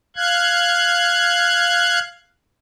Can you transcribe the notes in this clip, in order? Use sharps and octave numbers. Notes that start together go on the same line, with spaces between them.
F5 F#6 G#6